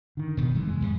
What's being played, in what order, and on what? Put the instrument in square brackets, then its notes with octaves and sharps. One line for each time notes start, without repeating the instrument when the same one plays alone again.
[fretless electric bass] D3 D#3
[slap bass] E1 B2 B3
[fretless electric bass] F#2 G#3 [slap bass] C3 E3
[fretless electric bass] G#3
[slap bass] F2 A2 G3